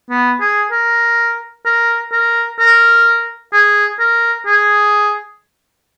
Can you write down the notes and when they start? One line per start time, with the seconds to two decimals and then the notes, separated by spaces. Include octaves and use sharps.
0.10 B3
0.40 G#4
0.72 A#4
1.66 A#4
2.12 A#4
2.59 A#4
3.53 G#4
4.00 A#4
4.46 G#4